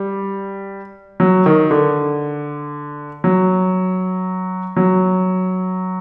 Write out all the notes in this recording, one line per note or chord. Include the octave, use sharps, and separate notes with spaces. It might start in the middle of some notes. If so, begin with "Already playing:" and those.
Already playing: G3
F#3
D#3
D3
F#3
F#3